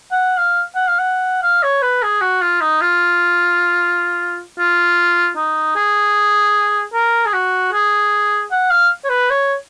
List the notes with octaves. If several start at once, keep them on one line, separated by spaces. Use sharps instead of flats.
F#5
F5
F#5
F5
F#5
F5
C#5
B4
G#4
F#4
F4
D#4
F4
F4
D#4
G#4
A#4
G#4
F#4
G#4
F#5
F5
C#5
B4
C#5